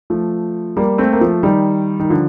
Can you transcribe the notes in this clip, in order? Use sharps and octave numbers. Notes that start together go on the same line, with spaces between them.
F3 A3
G3 A#3
A3 C4
A#3
F3 A3
D#3 G3
D#3
D3 F3